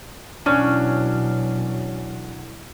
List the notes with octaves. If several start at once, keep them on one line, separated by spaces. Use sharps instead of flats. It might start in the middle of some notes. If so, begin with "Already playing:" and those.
E2 B2 F#3 C#4 D4